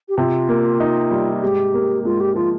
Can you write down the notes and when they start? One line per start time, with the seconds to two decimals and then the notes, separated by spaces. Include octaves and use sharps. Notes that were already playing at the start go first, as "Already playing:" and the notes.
0.09 G4
0.18 C3 F4
0.49 A#3
0.80 D#4
1.11 G3
1.42 G#2 G4
1.74 A#3
2.04 G#2 F4
2.20 G4
2.35 F3 F4